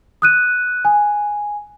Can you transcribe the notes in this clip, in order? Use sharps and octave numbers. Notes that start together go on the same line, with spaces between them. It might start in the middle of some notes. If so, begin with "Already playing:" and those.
D#6 F#6 D#7
G#5